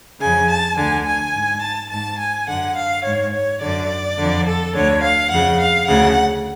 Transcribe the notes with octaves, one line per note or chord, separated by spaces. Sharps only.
F2 C#3 G#5
A5
D2 D3 G#5
G#5
G#2
A5
G#2 A5
G#5
F#2 D3 F#5
F5
G#2 C#5
C#5
F#2 D3 D5
F2 D3
A4
D2 D3 C#5
F5
F2 C#3 F#5
F5
D2 C#3 F#5